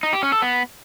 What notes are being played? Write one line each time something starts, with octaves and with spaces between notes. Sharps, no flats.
D#4
G4
C#4
A4
B3